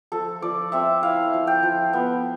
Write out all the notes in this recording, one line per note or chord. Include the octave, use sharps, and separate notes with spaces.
F3 A4
F3 D5
C4 E5
E4 F5
F3
G5
F3
B3